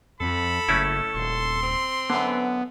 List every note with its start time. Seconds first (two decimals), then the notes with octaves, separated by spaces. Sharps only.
0.21 F2 A4 B5
0.69 F#1 A3 C#4 E4
1.15 D#1 C6
1.63 C4
2.10 F#2 D3 B3